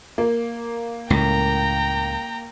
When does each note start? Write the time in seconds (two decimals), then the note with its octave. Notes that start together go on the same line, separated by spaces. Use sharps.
0.18 A#3
1.10 C#2 A2 G5 A#5